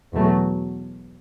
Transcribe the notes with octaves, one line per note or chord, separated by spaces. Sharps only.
E2 B2 F#3 A3